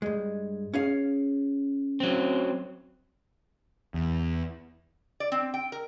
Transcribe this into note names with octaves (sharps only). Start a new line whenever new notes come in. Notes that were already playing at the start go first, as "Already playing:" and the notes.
G2 G#3
C#4 G#4 F5
F#3 C4
E2
D5
C4
G5
A#4